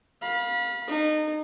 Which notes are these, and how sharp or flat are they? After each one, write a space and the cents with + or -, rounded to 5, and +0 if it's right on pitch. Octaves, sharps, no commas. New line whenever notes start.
F5 +25 B5 -30
D#4 -25 A4 -35